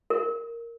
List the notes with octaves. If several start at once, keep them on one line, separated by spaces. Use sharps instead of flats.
A#4